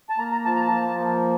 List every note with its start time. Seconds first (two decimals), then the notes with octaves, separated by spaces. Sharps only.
0.09 A5
0.18 A#3 A#5
0.32 A#5
0.45 F3 A5
0.56 A#5
0.60 A5
0.72 F3
0.99 A#3